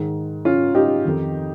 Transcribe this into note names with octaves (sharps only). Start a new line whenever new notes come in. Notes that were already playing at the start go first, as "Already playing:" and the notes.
Already playing: G#2 D#3
C#4 F4
D#4 G4
F2 D#3